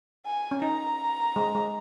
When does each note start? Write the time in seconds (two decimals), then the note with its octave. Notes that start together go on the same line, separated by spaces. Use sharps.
0.26 G#5
0.51 C#4
0.62 D#4 A#5
1.36 G#3
1.55 G#3